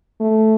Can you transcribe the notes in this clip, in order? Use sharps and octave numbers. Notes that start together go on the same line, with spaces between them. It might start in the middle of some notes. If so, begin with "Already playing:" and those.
A3